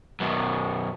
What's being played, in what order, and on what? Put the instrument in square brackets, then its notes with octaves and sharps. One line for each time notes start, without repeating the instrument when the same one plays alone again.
[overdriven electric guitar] F#2 B2